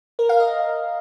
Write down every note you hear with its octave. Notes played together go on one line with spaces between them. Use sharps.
A#4
F5
D#5